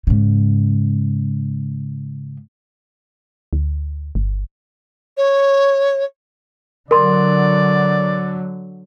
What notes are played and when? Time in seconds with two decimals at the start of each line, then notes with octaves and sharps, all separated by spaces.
0.07 G#2 C#3
3.53 D2
4.15 G1
5.17 C#5
6.91 D3 F#3 A#4 D5 C6